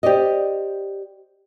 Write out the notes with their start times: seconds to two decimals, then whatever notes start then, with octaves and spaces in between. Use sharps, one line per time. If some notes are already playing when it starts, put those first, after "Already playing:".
0.03 G4 C5 D5 D#5